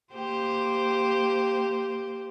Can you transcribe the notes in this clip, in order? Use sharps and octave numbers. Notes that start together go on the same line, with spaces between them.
A#3 G4 C5